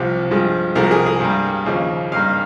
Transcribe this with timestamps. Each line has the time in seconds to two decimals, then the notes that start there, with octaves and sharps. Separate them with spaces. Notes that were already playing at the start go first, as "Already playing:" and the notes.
Already playing: C2 C3 F3
0.31 G2 F3 G#3
0.75 C2 C3 F3 G#3 A#4
0.91 G#4
1.06 G#4
1.21 G2 G3 A#3
1.66 D#2 C#3 F3
2.11 G#1 G2 G3 A#3 F5